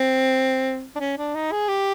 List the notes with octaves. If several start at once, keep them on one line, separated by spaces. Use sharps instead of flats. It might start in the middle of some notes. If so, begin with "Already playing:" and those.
Already playing: C4
D4
C#4
D4
D#4
G#4
G4